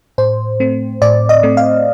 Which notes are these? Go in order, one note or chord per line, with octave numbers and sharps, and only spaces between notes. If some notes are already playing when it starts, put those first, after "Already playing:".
A2 C5
A3 C4
A2 D5
D#5
A3 C4
F5